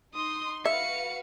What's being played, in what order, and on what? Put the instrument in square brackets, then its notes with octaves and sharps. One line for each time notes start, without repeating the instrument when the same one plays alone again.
[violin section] D#4 C6 [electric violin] D#6
[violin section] F#4 B4 F5 [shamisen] E5 [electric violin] C#7